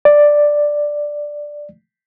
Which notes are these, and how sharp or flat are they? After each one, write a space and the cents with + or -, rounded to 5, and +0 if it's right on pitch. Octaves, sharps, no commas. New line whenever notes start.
D5 +5